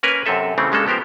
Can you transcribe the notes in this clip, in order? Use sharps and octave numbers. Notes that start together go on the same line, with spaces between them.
A#3 C#4 A#4 B4 G#5
F#2 C3 C4 A4 E5
C#3 E3 G3 A3 C4 C#4
C#3 G3 G#3 A#3 D4 A4
F3 B3 G4 A#4 C5